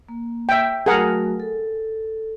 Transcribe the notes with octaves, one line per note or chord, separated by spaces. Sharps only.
A#3
E5 G5
F#3 A3 F#4 G#4 A#4 F#5
A4